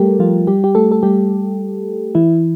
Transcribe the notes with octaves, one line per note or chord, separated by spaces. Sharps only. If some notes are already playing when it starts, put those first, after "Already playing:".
Already playing: G3 A3 G4 A4 A#4
F3 F4
G3 G4
G4
A3 A4
A4
G3 G4
E3 E4